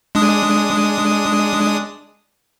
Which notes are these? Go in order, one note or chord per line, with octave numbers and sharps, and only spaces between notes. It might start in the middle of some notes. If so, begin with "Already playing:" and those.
G#3 D4 D#6